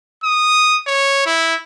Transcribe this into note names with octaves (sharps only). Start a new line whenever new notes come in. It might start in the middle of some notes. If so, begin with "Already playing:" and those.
D#6
C#5
E4